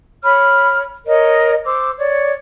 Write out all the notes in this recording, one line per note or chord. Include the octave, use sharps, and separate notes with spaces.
C#5 B5 F6
A#4 C#5 D#5
C5 D6 E6
C#5 D5